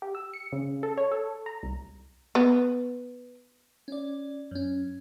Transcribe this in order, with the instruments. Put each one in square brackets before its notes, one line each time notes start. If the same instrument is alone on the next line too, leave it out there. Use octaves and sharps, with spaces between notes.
[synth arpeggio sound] G4
E6
C#7
C#3
A4
C#5
A4
A#5
C2
[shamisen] B3
[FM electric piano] C#4 D5
F#2 C#4